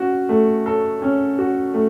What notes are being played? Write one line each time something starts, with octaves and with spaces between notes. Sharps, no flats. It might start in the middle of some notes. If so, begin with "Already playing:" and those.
Already playing: C#4 F#4
A3
A4
C#4
F#4
A3